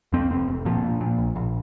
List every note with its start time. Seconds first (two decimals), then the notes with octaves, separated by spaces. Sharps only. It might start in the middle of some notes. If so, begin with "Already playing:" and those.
0.13 F2 C4
0.31 F1 C4
0.48 F1
0.65 A#2 F3
0.83 A#2
1.01 A#2
1.18 A#1
1.36 A#1